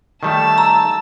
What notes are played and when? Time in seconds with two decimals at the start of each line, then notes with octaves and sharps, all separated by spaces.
0.23 D#3 G3 A3 A5 E6
0.58 A#5